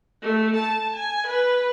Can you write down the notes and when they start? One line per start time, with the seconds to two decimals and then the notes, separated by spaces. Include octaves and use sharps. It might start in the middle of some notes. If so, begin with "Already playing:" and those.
0.23 A3
0.56 A5
0.95 G#5
1.27 B4